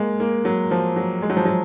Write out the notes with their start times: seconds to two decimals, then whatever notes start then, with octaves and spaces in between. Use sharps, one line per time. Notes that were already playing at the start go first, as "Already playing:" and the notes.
Already playing: G#3 A#3
0.20 A#3
0.45 F#3
0.71 F3
0.96 F#3
1.22 G#3
1.30 F#3
1.37 F3
1.45 F#3